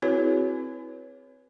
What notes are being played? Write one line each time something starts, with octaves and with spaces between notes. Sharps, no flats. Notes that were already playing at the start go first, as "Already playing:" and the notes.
C4 E4 F#4 G#4 B4 C#5